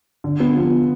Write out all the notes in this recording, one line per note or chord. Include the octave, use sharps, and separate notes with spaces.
D3
B3
F3